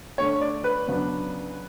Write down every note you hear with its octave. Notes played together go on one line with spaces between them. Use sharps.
D3 A3 D4 C#5
D5
B4
C#3 F#3 B3 D4